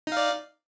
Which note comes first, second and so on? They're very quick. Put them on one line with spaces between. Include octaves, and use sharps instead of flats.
D#4 F5 D5